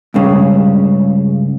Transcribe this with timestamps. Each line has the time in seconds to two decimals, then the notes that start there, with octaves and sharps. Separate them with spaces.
0.14 C#2 G2 C#3